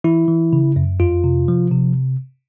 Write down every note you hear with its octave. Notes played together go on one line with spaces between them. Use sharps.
E3 E4
E3
C#3
F#2
F2 F4
C3
F3
C3